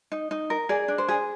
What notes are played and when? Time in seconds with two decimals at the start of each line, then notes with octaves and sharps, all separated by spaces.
0.12 D#4
0.31 D#4
0.50 A#4
0.69 G#4 D5
0.88 D4
0.98 C5
1.08 G#4